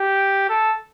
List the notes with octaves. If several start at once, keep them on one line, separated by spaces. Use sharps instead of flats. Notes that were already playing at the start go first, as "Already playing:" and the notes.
Already playing: G4
A4